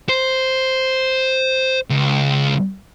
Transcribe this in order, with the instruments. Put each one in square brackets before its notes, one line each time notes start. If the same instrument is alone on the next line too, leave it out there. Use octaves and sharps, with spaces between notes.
[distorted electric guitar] C5
C#2